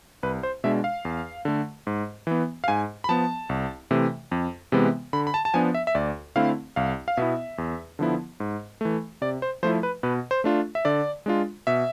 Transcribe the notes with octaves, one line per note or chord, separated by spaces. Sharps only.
C2 B4
C5
B2 G#3 D4 E5
F5
E2
D3 A3
G#2
E3 B3
F5
G#2 G#5
B5
F3 B3 A5
C2
C3 E3 A3
F2
C3 E3 G#3 B3
D3 B5
B5
A5
A5
F3 B3 D4 G#5
E5
E5
D2 D5
D3 A3 C4 E4 F5
C2 F5
F5
B2 B3 E4 E5
E2
D3 F3 B3 E4
G#2
E3 A3
C3 D5
C5
F3 A3 E4 C5
B4
B2 B4
C5
A3 D4 F4
E5
D3 D5
G#3 D4 F4
B2 E5